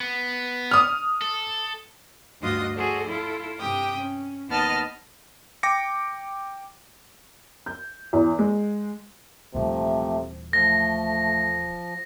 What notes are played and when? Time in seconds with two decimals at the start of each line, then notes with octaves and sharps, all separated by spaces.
0.01 B3
0.71 D#6 F6
1.22 A4
2.41 D2 G2 F4 F#4 D#5 D#6
2.74 F#4 G#4 A4 C5 D5
3.08 E4 F4 A4
3.60 G2 C3 G4 G5 D#6
3.98 C#4
4.50 D#2 B3 D#5 A5 F6 A6
5.63 G5 D6 A#6 C#7
7.66 G6
8.13 E2
8.39 G#3
9.55 D#1 C3 E3 F3 A3
10.53 F3 A3 A#6